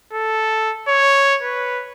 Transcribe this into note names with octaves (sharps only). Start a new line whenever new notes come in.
A4
C#5
B4